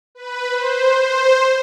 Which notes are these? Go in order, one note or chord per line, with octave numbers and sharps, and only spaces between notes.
B4
C5
C5